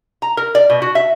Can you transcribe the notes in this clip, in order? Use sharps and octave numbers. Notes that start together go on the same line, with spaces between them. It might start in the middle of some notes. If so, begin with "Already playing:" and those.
A#5
A#4
D5
B2
F#4
E5